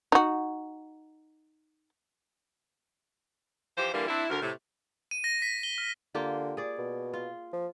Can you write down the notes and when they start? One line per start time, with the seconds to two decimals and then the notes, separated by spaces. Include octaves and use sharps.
0.12 D#4 F#4
3.77 E3 F3 G4 C5
3.94 D3 E3 G3 A#3
4.08 C4 D4 E4
4.30 D2 A#4
4.42 A2 C3
5.11 D#7
5.24 A#6
5.42 B6
5.63 G7
5.78 F6
6.15 D3 A#3 F4 G4
6.57 G#4 D5
6.78 B2
7.14 F4
7.53 F3